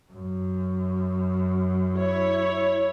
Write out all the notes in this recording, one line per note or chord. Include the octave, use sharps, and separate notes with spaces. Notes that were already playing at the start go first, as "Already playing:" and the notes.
F#2
E4 C#5